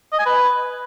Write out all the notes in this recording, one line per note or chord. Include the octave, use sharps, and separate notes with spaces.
D#5
G#5
B4